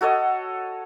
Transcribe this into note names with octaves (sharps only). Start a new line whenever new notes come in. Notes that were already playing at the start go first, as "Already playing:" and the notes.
F#4 A4 C#5 D#5